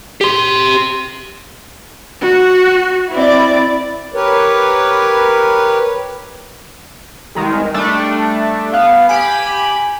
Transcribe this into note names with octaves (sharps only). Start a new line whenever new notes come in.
G4 C6
F#4
C4 E4 D5
G4 A#4 B4 C#5
C2 D#3 G#3
G3 A3 D4
B3 F5
G4 G#5 B5